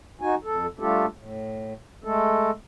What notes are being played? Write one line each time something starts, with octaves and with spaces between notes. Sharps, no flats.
D#4 F#4 G#5
F2 A4
G3 A3 D4 F4 G4 A4
A2
G#3 A3 A4